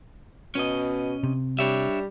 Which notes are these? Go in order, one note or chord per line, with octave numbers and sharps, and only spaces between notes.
B2 C#4 D#5
C3
G3 D4 C#5 E5